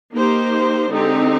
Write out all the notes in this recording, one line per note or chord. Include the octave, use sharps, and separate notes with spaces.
A#3 D#4 G4 C5
D3 G#3 C4 D#4 G4